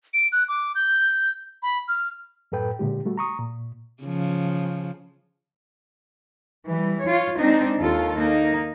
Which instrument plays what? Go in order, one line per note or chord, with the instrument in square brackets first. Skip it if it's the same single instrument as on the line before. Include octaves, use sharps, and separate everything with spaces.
[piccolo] D7
F#6
D6
G6
B5
F6
[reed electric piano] F#2 A2 A4 B4 G5
A#2 D3 G#3 G4
G3 A3 F#4
A#5 C#6 D#6
A#2
[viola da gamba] C#3 F3
[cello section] E3 G3
F4 C#5
G#3 C4 D4 D#4
D#2 F4 A4
A#3 D#4